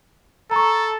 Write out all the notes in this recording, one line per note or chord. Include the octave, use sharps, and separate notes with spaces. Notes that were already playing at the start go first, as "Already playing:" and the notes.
A4 A#5 C#6